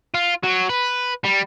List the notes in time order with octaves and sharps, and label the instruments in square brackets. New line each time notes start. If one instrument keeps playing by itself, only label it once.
[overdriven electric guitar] F4
F#3
B4
G3